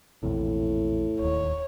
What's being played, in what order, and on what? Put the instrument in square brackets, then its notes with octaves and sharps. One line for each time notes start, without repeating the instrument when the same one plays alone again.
[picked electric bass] A#1 E2 C3 [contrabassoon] A2
[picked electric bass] D1 D#2 [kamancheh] C#5